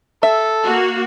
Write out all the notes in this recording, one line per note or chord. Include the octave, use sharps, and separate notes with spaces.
A4 E5
A#3 F#4